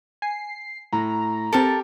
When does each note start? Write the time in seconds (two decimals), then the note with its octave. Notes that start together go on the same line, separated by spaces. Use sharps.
0.22 G#5 C7
0.93 A2 A#5
1.53 C4 G4 A4 A#4 A5 D7